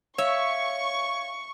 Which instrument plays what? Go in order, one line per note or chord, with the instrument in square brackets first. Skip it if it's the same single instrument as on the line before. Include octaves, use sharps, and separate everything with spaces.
[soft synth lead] C#5 [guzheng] E5 [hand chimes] F5 [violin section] C#6